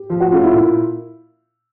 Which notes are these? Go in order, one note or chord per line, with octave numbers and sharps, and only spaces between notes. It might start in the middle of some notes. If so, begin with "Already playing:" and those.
Already playing: G4
F3 F4
F#4
A3 C#4 F4
E4
A#2